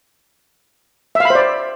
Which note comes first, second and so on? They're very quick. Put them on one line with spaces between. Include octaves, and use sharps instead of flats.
E5 F5 B5 C5 D5